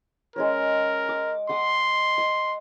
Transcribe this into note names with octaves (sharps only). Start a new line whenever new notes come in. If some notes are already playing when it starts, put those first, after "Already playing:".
G#3 C#4 A#4 C#5
D6
F#5 C6 D6 D#6
D#5